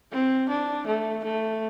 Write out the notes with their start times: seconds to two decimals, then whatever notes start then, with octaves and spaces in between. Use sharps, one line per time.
0.12 C4
0.49 D4
0.87 A3
1.24 A3